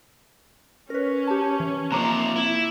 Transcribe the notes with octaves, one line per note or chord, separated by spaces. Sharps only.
C#4 A#4 B4 C#5
G4 A5
E3
C3 F3 A#3 A#5 D6
E4